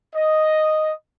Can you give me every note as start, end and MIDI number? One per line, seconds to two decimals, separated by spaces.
0.15 0.92 75